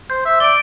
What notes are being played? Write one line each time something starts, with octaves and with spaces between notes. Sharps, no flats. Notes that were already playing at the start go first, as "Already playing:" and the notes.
C5 G6
E5
D5 D7 G7